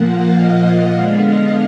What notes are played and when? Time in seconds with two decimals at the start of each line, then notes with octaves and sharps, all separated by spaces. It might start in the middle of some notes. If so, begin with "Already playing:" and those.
Already playing: A#2 F3 A#3 F#5
0.08 F5
0.38 D#5
0.95 D3 G#3 B3 D4 F5
1.24 D#5